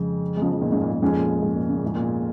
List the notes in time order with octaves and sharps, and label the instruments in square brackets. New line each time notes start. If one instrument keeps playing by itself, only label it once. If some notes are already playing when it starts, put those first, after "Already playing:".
Already playing: [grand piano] F2 C#3 G#3
[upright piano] G#3
C#3 F3
F3
A#2 D#3
G#2 C#3
A#2
A#2
[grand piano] F2 F3 G#3 C#4 [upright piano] G#2 C#3
[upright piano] A#2
G#2
A#2
C#3
A#2
G#2
A#2